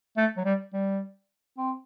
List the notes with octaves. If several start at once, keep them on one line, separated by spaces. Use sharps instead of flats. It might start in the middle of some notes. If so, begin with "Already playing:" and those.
A3
F#3
G3
G3
C4